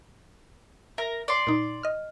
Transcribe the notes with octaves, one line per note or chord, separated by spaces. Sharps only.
A#4 E5
D5 C6
A#2 D#4
D#5 F6